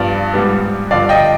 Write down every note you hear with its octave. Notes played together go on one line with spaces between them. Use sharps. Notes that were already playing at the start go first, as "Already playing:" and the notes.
Already playing: G2 F3 B3 D5 F5
G#2 G3 B3
G2 D3 F3 D5 F5
D#5 G5